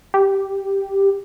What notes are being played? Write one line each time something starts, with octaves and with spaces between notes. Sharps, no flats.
G4